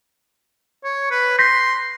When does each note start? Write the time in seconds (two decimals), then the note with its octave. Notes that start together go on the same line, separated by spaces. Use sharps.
0.84 C#5
1.11 B4
1.39 C6 G6 A#6 B6